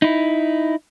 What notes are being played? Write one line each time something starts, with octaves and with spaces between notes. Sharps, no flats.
D#4 E4